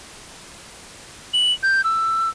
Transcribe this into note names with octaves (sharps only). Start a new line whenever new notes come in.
F#7
G6
E6